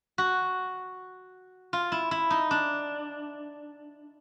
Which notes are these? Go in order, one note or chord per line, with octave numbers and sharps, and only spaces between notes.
F#4
F4
E4
E4
D#4
D4